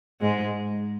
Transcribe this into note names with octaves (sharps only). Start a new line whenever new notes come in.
G#2 G#3